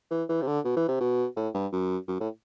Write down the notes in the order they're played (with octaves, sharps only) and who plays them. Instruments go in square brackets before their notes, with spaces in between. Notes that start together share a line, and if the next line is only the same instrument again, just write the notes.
[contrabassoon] E3
E3
C3
D3
B2
E3
C3
B2
A2
G2
F#2
F#2
A2